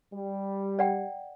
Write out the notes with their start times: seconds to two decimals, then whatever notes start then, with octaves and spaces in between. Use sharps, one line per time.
0.13 G3
0.79 D5 F#5 G5